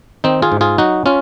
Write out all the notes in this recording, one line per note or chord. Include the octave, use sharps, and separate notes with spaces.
D#3 C4 D#4
F4 G#4
G#2
F4 G#4
F#3 D#4 F#4
C#4 F4